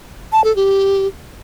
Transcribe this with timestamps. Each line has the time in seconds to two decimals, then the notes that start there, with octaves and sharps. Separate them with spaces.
0.33 A5
0.44 A4
0.56 G4